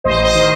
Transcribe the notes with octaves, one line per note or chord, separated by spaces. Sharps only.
A1 C5 D#5
C5 D#5
D#3